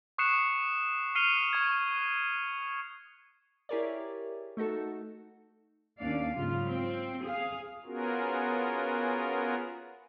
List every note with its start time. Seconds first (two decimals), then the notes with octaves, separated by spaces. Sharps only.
0.18 C#6 D#6 F#6 C7 C#7 E7
1.15 F6 C7 C#7 D#7 F7 G7
1.53 C#6 G#6
3.69 E4 G4 G#4 A#4 C#5 D5
4.57 A3 D#4 F#4 A4
5.99 D#2 C#4 D4 D5 F5
6.35 G#2 C#3 F#3 F4
6.67 C4
7.25 G#4 F5
7.85 B3 C#4 F4 F#4 G#4 A#4